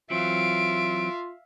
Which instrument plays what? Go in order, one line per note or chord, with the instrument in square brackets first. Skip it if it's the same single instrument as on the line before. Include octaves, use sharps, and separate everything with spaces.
[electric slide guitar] E3 F#3 C4 [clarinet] F4 [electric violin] E5 F5 [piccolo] D7